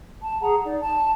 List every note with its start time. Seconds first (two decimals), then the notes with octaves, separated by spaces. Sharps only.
0.22 A5
0.41 G#4 F#5 A#5
0.63 D#4 D5
0.83 A5